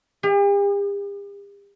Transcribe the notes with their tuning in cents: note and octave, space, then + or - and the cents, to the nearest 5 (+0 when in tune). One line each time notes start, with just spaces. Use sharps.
G4 +45